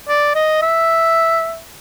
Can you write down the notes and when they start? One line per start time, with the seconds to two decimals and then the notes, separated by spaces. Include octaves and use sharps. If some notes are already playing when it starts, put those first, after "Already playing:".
0.08 D5
0.35 D#5
0.62 E5